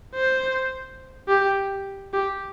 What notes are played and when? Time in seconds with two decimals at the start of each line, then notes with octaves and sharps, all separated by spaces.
0.15 C5
1.28 G4
2.13 G4